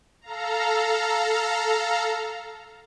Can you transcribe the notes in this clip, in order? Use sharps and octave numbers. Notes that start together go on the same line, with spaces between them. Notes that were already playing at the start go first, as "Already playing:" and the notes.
A4 F5 A#5